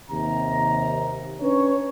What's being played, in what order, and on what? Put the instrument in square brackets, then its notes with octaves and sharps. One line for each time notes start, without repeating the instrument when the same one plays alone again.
[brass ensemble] D#2 C3 A#5
C#4 D4 B4 C#5